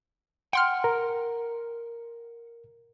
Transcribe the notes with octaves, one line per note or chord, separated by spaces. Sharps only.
F#5 G5 C6 F6
A#4